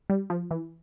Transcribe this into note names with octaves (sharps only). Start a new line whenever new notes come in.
G3
F3
E3